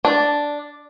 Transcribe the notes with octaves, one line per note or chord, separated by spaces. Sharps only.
D4